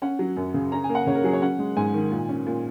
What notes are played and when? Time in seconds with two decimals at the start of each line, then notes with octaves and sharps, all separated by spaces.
0.02 C#4 F#5
0.19 F#3
0.37 F#2
0.54 C#3
0.72 C#4 A#5
0.84 G#5
0.89 A#3
0.95 F#5
1.07 C#3 C#5
1.15 A#4
1.24 F#3 G#4
1.33 C#5
1.42 C#4 F#5
1.59 G#3
1.77 G#2 G#5
1.94 D#3
2.12 A#2
2.29 C#4
2.46 A#2